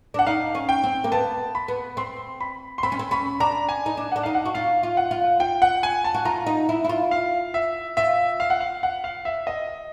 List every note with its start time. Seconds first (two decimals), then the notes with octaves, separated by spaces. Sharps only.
0.14 D4 F#5
0.26 D#4 F5
0.55 C#4
0.69 G5
0.84 C4
1.04 A#3
1.12 B3 A5
1.55 B5
1.68 B3
1.97 C4 C6
2.41 B5
2.78 C6
2.83 C4 B5
2.92 C#4
2.99 C4
3.11 C#4 B5
3.40 D4 A#5
3.69 G#5
3.86 D#4
3.97 D4
4.12 D4 F#5
4.23 D#4 F5
4.35 F#5
4.45 F#4
4.54 F4 F5
4.83 F4
4.97 F#5
5.11 F4
5.40 F4 G5
5.62 F#5
5.83 G#5
6.04 A5
6.14 F#4
6.25 F4 A#5
6.47 D#4
6.69 E4
6.84 E4
6.89 F4
7.11 F5
7.54 E5
7.97 F4 E5
8.40 F5
8.50 F#5
8.61 F5
8.83 F#5
9.04 F5
9.25 E5
9.47 D#5